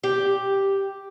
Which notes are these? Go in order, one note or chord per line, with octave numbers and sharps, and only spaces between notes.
G4